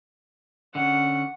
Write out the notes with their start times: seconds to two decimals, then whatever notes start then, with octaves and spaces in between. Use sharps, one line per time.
0.75 D3 C#4 F#5